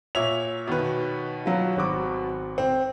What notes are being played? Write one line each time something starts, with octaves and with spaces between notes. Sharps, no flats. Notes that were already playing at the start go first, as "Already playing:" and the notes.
A#2 C#5 E5 F7
B2 D#3 B4
F#3 F4
G#1 F#4 D6
C4